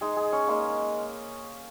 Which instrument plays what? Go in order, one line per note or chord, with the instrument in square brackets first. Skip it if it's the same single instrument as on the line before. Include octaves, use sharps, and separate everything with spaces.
[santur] G#3 D#4 G#4
G#4
C#4 C#5
G#3 A#3 D#4 A#4